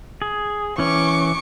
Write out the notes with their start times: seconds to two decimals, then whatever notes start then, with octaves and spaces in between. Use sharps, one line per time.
0.22 G#4
0.78 E3 C#4 C#6 D6